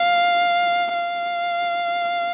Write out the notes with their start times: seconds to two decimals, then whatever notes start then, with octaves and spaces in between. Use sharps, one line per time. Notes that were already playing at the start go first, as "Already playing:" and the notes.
Already playing: F5
0.94 F5